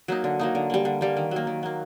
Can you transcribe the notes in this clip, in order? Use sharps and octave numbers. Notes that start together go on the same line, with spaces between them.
F#3 A#3 D#4
D3
F#3 A#3 D#4
D3
G3 A#3
D3
G3 A#3
D#3
F#3 A#3
D#3
F#3 A#3